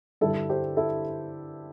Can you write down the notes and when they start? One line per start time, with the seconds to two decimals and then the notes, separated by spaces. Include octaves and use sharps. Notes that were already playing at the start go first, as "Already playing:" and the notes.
0.21 G2 D3 G3 E4 A4
0.50 G4 C5
0.77 E4 A4